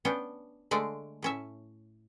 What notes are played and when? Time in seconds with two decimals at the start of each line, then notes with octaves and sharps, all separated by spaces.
0.05 B3 C#4 D4 G5
0.71 D3 G#3 A3 D5
1.22 A2 C#4 E5